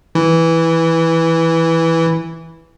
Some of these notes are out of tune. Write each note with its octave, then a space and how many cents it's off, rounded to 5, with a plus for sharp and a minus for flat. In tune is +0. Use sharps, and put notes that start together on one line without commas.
E3 -5